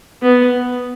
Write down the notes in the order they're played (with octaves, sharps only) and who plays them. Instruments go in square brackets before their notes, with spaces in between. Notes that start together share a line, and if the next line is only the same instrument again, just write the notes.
[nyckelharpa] B3